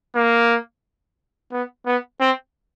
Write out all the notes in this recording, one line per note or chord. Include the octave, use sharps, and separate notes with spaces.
A#3
B3
B3
C4